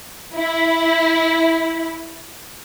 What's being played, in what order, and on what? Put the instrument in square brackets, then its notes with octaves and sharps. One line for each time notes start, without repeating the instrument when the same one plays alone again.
[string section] E4